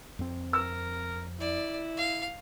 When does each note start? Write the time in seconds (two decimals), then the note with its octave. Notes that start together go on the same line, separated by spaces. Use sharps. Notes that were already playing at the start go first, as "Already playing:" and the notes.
0.19 F2 C4
0.53 A#4 E6
1.40 E4 D5
1.97 F5